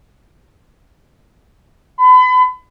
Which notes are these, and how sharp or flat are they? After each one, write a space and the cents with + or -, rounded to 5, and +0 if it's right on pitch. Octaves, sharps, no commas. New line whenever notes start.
B5 +35